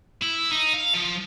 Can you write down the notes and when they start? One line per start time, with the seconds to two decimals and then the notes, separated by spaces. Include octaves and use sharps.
0.22 E4
0.51 D#4
0.73 F5
0.94 F3